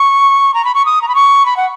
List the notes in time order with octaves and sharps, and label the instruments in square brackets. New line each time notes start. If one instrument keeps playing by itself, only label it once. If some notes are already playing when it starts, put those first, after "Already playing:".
Already playing: [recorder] C#6
A#5
B5
C#6
D#6
A#5
B5
C#6
B5
F#5